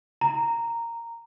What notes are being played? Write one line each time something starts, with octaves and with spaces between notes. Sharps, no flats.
A#5